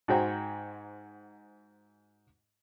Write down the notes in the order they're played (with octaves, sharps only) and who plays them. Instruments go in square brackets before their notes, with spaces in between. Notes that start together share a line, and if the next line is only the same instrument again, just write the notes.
[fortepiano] G#2 F#4 C5 G5 G#5 A#5